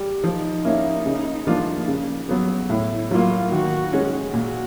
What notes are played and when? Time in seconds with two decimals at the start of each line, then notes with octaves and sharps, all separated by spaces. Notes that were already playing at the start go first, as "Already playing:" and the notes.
Already playing: G3
0.24 F3 D#4
0.65 A#3 C#4 E4
1.06 C#3
1.47 F3 A#3 D4 F4
1.88 C#3
2.29 F#3 B3
2.69 A2 E4
3.11 F#3 A#3 F4
3.51 D#3 F#4
3.93 G#3 C#4
4.34 A#2 F#4